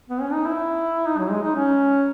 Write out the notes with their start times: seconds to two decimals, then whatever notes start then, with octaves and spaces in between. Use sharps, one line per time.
0.09 B3
0.21 C#4
0.33 D#4
0.46 E4
1.07 D#4
1.18 F#3
1.31 G#3
1.43 D#4
1.56 C#4